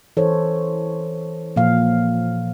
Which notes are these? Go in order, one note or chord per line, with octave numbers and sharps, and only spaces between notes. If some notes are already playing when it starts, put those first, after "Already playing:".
E3 A4 C5 C#5
A#2 F3 F5